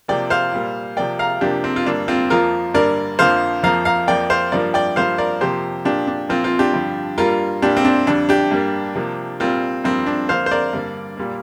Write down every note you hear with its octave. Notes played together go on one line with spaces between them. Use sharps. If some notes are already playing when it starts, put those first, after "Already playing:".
C3 F3 A#3 D5 G5
C5 F5
A#2 G3 A#3
C3 F3 A#3 D5 G5
F5 A#5
C3 F3 A#3 D4 G4
C4
F4
G2 D3 A#3 D4
C4 F4
F2 F3 A#3 F4 A#4
G2 D3 A#3 A#4 D5
F2 D3 F3 A#3 C5 F5
F2 F3 A#3 F5 A#5
F5 A#5
F2 F3 A#3 D5 G5
C5 F5
G2 F3 A#3 A#4 D5
D5 G5
G2 F3 A#3 C5 F5
A#4 D5
F2 C3 F3 A#3 G4 C5
A#2 F3 A#3 D4 G4
D4
A#2 F3 A#3 C4 F4
C4 F4
D4 G4
G2 D3 F3
G2 G3 A#3 F4 A#4
A#2 G3 A#3 D4 G4
C4
D4
F2 D3 G3 D4
D4 G4
G2 G3 A#3
C3 F3 A#3
A#2 G3 A#3 C4 F4
G2 F3 A#3 C4
D4
F2 D3 A#3 C5 F5
C5
A#4 D5
G2 D3 G3 A#3
A#2 G3 A#3